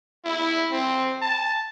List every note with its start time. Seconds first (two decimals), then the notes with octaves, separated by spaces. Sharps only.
0.25 E4
0.72 C4
1.22 A5